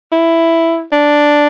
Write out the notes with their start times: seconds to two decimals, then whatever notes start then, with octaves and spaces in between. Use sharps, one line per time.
0.12 E4
0.92 D4